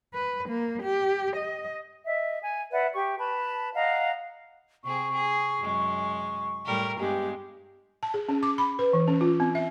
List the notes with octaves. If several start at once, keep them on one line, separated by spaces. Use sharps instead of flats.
B4
A#3
G4
D#5
D#5 E5
G#5
B4 D5 E5 F#5
G4 C#6
B4 A5 B5
D#5 F5 F#5 A#5
C3 C4 G#4 C#6
G#4
F#2 G#3
A2 G3 A#4
G2 G#3 B3 G4
A5
G#4
C#4
D6
B5
B4
E3
C#4
F4
C4
E5